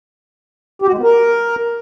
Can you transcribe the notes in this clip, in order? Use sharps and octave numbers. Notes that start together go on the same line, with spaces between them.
G4
F#4
G#3
B3
A#4